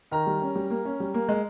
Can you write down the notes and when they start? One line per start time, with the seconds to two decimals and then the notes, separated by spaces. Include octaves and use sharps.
0.11 D#3 A#4 A#5
0.27 G3
0.42 C#4
0.55 G3
0.70 A#3
0.85 C#4
1.00 G3
1.14 A#3
1.29 G#3